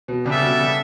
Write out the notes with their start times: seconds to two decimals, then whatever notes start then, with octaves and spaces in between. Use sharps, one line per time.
0.08 B2
0.25 C#3 G3 B3 D4 A4 E5
0.38 C#3
0.42 B2
0.59 C#3